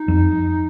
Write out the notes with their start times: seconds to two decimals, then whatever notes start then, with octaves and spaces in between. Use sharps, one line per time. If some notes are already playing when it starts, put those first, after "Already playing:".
Already playing: D#4
0.08 F2